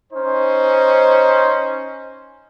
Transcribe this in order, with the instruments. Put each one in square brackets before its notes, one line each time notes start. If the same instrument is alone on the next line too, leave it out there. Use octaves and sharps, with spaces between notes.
[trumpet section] C#4 D#4 C5